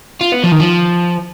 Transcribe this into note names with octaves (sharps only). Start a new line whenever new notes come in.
F4
B3
F3
D#3
F3